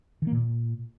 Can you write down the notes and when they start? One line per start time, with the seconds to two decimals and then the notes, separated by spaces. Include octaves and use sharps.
0.22 D#3
0.27 A#3
0.32 A#2